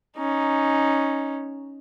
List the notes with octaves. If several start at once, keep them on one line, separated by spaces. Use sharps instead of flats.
C#4 D#4